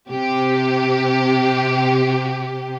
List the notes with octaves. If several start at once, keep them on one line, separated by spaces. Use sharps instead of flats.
C3 G4